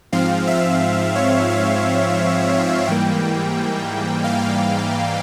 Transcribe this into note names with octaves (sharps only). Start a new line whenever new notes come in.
G#2 F3 C4 F5
E5
C#5
F5
G#2 E3 G3 A#3 G5
F5